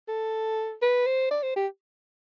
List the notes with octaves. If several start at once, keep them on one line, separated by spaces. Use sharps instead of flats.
A4
B4
C5
D5
C5
G4